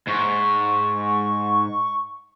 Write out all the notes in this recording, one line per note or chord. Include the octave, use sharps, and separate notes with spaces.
G#2 C#6